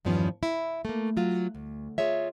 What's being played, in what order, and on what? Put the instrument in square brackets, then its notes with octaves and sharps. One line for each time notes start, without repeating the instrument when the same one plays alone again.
[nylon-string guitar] E2 G2 D#3 F3 B3 C#4
E4
A3 A#3
F#3 F4
D2
F4 G#4 C#5 E5